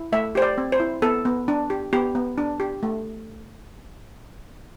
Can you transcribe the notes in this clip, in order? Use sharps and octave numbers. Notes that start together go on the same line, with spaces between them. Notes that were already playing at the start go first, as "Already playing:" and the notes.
Already playing: E4
A3 E5
G4 C5
D5
C4
C5
E4
B3 A4
B3
D4
G4
B3 G4
B3
D4
G4
A3